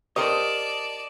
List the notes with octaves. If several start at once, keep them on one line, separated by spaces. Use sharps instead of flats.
G4 A#4 C5 D5 D#5 A5